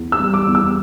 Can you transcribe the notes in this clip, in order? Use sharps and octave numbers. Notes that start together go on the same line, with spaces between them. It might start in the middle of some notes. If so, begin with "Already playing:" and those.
Already playing: E2
E6
G3
D6
E2
E6